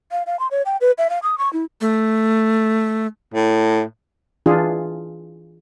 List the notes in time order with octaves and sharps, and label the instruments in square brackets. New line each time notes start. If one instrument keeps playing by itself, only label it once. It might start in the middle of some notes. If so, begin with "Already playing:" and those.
[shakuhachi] F5
F5
C6
C#5
G5
B4
E5
F5
D#6
C#6
E4
[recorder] A3
[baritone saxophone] A2
[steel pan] E3 D4 F4 G#4